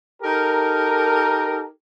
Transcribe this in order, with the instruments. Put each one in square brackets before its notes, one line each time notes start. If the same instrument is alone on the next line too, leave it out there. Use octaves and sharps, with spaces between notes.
[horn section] D#4 G4 A4 A#4